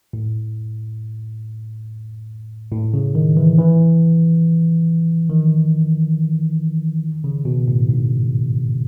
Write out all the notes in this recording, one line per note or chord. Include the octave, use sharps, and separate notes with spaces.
A2
A2
C#3
D#3
E3
E3
D#3
C#3
B2
A2
G#2